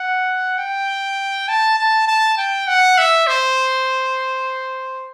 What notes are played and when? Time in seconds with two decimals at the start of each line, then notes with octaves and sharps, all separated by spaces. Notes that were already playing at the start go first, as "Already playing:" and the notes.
Already playing: F#5
0.58 G5
1.48 A5
1.78 A5
2.08 A5
2.38 G5
2.67 F#5
2.98 E5
3.27 C5